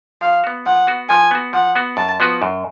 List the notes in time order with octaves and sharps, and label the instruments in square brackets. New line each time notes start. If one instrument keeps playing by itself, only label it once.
[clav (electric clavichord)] F3 [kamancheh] F5
[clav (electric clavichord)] B3 F#4
[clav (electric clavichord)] F3 [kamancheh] F#5
[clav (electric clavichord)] B3 F#4
[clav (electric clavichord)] F3 [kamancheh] G#5
[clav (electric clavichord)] B3 F#4
[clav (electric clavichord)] F3 [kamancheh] F#5
[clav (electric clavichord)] B3 F#4
[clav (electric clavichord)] F#2 [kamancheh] A5
[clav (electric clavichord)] F3 B3 F#4 B4
F#2